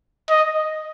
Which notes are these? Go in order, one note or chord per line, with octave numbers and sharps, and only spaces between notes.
D#5